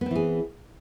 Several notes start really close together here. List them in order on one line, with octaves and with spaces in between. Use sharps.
B3 C4 E3 G#4